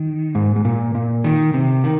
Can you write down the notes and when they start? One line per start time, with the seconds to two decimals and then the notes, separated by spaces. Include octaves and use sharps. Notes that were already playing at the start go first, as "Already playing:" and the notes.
Already playing: D#3
0.35 G#2
0.56 G#2
0.65 A#2
0.95 A#2
1.24 D#3
1.54 C3
1.84 D#3